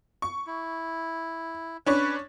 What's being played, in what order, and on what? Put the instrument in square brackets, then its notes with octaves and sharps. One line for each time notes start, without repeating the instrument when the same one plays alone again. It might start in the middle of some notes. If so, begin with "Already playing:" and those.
[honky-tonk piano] C#6
[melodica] E4
[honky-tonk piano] C#4 D4 C#6 [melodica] B4